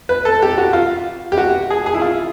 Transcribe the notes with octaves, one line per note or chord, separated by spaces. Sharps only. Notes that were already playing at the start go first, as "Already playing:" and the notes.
B4
A4
G4
F#4
F4
G4
F#4
G#4
G#4
E4
F4